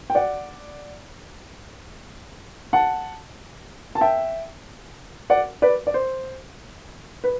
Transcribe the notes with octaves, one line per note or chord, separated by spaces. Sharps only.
G5
D5 F#5
F#5 A5
A5
E5 G5
D5 F#5
B4 D5
D5
C5
B4